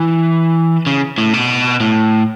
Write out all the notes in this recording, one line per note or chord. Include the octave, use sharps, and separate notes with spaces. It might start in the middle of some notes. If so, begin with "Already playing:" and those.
Already playing: E3
C#3
A2
B2
A2